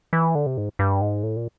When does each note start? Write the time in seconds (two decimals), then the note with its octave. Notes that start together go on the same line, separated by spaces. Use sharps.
0.13 E3
0.35 D3
0.46 C3
0.58 G#2
0.79 G2
1.01 G#2
1.23 A2
1.36 A#2